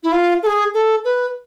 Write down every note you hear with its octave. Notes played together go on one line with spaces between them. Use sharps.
E4
F4
A4
G#4
A4
B4